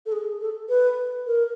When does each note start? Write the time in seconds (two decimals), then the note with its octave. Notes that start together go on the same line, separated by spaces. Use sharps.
0.06 A4
0.12 G#4
0.41 A4
0.69 B4
1.27 A#4